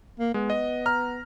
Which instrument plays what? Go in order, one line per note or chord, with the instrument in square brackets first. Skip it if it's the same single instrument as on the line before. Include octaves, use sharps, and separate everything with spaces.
[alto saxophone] A#3
[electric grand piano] G#3 [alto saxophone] B3
[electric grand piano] D#5
A#5 F6